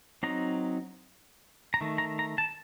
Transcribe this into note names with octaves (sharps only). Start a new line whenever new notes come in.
F#3 C4 D#4 A#5
A#5
D#3 A3
A#5
A#5
A5